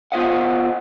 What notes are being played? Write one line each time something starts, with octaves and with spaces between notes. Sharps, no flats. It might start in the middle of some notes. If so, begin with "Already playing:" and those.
B3 F4 C5 D#5 F5 F#5